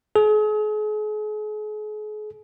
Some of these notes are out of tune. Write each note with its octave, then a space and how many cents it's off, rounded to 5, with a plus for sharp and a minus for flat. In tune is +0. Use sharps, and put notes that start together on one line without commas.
G#4 +40